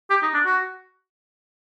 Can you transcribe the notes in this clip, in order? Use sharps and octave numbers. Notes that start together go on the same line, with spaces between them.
G4
D#4
D4
F#4